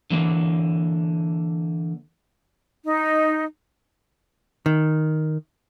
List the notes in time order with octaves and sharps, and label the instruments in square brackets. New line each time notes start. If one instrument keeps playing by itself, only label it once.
[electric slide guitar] D3 E3 A#3
[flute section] D#4
[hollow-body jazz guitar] D#3